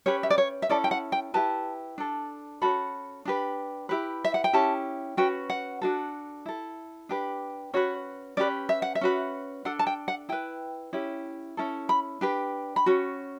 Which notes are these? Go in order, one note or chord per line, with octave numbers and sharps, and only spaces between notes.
C#4 G4 B4 C#5
E5
D5
C#5
E5
C#4 E4 A4 D5
G5
F#5
G5
E4 G4 B4 A5
D4 A4
C#4 F#4 A4 B5
D4 G4 B4
E4 G4 B4
E5
F#5
G5
C#4 E4 G4 A5
C#4 F#4 B4 G5
F#5
D4 F#4 A4
E4 A4
D4 G4 B4
C#4 F#4 B4 C#5
C#4 G4 B4 D5
E5
F#5
E5
C#4 F#4 B4
D4 A4 F#5
A5
G5
F#5
E4 B4 G5
C#4 E4 G4
C#4 E4 A4
B5
D4 G4 B4
B5
C#4 F#4